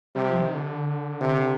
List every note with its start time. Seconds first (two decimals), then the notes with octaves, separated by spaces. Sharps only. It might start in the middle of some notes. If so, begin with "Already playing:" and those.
0.15 C3 G3
0.29 F3
0.41 D#3
0.54 D3
1.21 C3